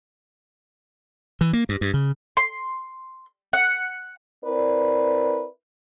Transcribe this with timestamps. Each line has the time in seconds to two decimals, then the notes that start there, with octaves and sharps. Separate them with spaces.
1.41 E3
1.53 A#3
1.69 G2
1.81 G2
1.94 C#3
2.37 C6
3.53 F#5
4.45 C4 E4 A#4 B4 D5